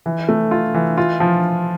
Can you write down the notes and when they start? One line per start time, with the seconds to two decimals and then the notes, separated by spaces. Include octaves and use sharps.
0.06 E3
0.29 A3
0.51 F4
0.74 E3
0.98 F4
1.20 F3